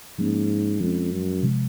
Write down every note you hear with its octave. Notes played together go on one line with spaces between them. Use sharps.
G#2 F3 A#3 C#4
F2 F3 G#3 C#4
F#2
C3 F3 G#3